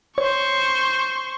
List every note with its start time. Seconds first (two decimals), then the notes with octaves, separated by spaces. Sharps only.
0.18 C5 C#5 C#6